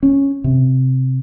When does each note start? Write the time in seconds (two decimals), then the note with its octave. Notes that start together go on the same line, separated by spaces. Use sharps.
0.03 C#4
0.44 C3